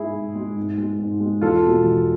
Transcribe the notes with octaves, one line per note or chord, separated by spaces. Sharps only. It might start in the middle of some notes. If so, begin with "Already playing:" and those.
Already playing: G#2 G#3 E4 G#4
G#2
G#3
G#2
G#3
G#2
G#3
E2 F4 A4
B2 G#3
E2